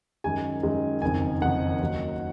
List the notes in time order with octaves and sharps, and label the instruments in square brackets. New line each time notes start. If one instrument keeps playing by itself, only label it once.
[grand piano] F#2 D#3 G#3 G#5
F#2 D#3 G#3
F#1 F2 D#3 G#5
F#1 F2 D#3 F#5
D#2 D#3 F#3